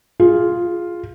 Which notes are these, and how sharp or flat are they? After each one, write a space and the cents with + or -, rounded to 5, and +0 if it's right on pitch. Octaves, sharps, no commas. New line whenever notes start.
F4 +0 G#4 +0